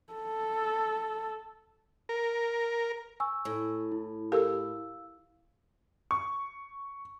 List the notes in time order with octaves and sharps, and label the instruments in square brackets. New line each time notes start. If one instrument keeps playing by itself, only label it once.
[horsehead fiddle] A4
[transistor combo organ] A#4
[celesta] G#5 C#6 E6
[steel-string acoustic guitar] A2
[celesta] E4
[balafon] G4 A4 A#4 [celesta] F5 E6
[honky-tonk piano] C#6